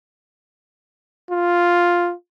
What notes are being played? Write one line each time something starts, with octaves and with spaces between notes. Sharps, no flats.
F4